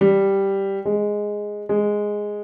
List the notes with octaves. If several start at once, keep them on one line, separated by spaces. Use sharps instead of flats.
G3
G#3
G#3